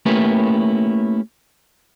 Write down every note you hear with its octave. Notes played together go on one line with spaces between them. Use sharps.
A3 A#3 C#4 E4 G4 B4